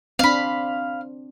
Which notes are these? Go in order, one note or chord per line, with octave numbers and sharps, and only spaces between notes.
C4 D4 F5 B5